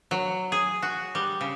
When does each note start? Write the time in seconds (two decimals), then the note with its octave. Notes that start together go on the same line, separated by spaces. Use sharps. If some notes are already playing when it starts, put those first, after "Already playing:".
0.11 F#3
0.52 G#4
0.82 F#4
1.15 G3
1.41 C#3